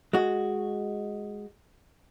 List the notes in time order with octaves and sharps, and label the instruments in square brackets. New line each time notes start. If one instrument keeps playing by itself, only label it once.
[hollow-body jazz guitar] G#3 F#4